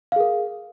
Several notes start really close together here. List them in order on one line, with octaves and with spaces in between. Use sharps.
F5 G#4 A#4